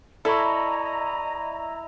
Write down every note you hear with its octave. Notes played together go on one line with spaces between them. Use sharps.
E4 A4 D5 D#5 A#5 B5 C#6